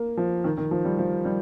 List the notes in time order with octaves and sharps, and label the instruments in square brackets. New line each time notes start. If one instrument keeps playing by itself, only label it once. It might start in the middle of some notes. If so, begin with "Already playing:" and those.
Already playing: [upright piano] A#3
F3
D#3
D#3
F3
G3
F3
G3